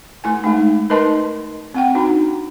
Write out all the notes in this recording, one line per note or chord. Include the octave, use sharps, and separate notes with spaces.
A3 E4 G#5
G#3 A3 D#4
D#4 A#4 B4 D#5 A5 C6
C4 F#5 G5
D4 D#4 F#4